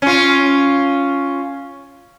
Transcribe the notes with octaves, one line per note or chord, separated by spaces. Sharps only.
C#4 F4